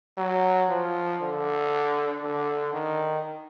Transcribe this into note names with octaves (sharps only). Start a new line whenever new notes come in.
F#3
F3
D3
D3
D#3